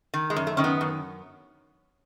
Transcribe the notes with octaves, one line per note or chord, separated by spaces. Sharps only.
D#3
G#3
F#2
A3
D#3 C#4
B3
F#2